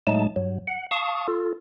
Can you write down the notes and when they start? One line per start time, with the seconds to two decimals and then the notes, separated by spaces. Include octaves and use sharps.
0.07 A2 F#3 G#3 A3 D#4 A5
0.36 G2 F#3
0.67 F#5
0.91 F5 A5 C#6 D#6
1.28 F4 A4